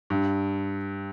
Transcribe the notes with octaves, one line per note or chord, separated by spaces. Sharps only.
G2